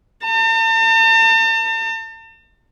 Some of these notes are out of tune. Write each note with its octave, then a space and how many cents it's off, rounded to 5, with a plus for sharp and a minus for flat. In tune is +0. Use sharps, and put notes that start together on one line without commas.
A5 +45